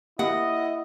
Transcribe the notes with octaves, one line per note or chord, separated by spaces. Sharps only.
A#3 E4 G4 D#5 F#5